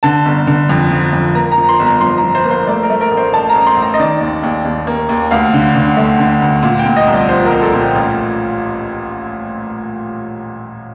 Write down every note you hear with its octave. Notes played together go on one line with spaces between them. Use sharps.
D3 A5
G1
D3
F2
F3
F2
A#3 A#5
A#5
F3
C6
G1
A#5
F3 C6
A#5
F3
C5
A#3
C5
A3 D5
A#4
A3
A#4
A1
C5
A1 A5
A#5
A1
C6
A1
A#5
D#5
D#3 D5
D#2
D#2
D#2
A#3
D#2
D2 F5
D3
D3
A3
D3
D2
A#2
G5
A#2
D#5
C2
D5
F3 C5
A#4
C2
A4
A#2
G4
A1 F4